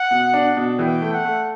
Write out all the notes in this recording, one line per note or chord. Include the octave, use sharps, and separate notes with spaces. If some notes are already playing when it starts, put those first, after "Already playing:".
Already playing: F#5
B2
D4
B2
E3 G5
A3
F#5
A3